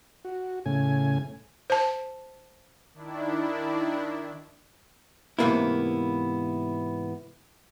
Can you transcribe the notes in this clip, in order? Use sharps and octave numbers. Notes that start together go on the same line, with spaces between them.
F#4
A2 C#3 G#5
C5 A5
D#3 D4 E4
G#2 C3 E3 A#3 B3 E4